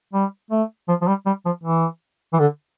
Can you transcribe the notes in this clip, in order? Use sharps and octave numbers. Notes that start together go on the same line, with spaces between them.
G3
A3
F3
F3
G3
G3
F3
E3
E3
D3